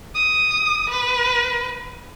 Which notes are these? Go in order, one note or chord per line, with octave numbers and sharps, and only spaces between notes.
D#6
B4